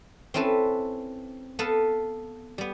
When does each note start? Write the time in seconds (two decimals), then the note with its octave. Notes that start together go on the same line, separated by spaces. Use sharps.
0.34 C4 C#4 E4 A4 B4
1.59 B3 A4 B4 F5 A5
2.58 G3 B3